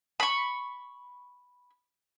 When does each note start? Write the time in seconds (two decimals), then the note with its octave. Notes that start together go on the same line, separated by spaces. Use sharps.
0.20 B5 C#6